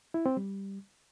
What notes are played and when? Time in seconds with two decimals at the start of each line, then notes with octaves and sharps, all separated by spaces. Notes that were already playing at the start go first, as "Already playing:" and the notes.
0.14 E4
0.26 C4
0.37 G3